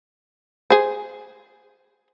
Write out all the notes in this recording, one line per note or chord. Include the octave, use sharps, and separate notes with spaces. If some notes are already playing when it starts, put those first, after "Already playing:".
G#4 C5